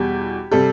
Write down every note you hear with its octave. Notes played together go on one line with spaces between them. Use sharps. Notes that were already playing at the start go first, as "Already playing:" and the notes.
Already playing: E2 B2 G3 G4
C3 G3 A4